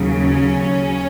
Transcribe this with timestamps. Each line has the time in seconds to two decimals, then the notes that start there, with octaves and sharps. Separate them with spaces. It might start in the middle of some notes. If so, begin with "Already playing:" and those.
Already playing: D#2 C#3 F#3
0.23 C#4